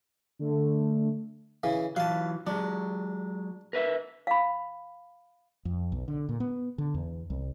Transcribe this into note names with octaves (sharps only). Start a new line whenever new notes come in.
D3 A3
C#3 E3
E3 F#3 F5 A5
F#3 G#3 D4
A#4 B4 E5
F5 B5
F2
B1
D3
A#2
B3
D3
E2
C2